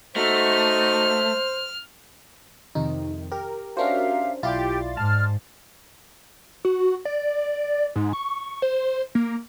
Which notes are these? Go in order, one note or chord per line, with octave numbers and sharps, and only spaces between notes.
A3 D#4 F#4 C5 F6
F2 C3 D#3 D#4
G4 A#4
C#4 D4 F#4 G4 A#4 C5 E5 F5
B1 E4 F4 G4 D5 C6 A6
G#2 A5 F6
F#4
D5
G#2
C#6
C5
A#3